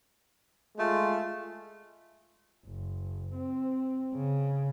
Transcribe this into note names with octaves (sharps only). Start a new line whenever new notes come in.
G#3 A3 F4
F#1
C4
C#3